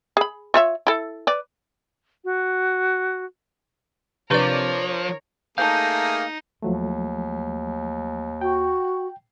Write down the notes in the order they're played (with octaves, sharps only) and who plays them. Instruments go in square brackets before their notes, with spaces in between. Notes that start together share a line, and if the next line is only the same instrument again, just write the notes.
[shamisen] G#4 B5
F4 C#5 E5
E4 A4
B4 D5
[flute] F#4
[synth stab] C3 D5 [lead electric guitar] F3 [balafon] D4 B4 C#6 [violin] A#4 C#5
[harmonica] A3 A#3 G#4 [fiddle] D#4 [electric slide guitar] F5 [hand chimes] A5 G6
[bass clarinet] D#2 [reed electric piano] F3 F#3 A3
[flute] F#4 [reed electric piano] G5